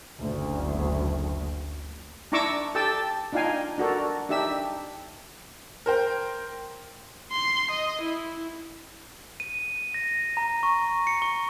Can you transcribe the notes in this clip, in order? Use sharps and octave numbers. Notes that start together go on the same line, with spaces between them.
F#1 D2
D4 E4 A#5 C#6 D6 E6
G4 A4 G5 A5 E6
D4 D#4 F4 F5 G5 G#5
D4 F#4 A4 A#4
D4 D#4 G4 E5 E6
A#4 C5 G5
C6
D#5
E4
D#7
A#6
A#5
C#6
C#7
C#6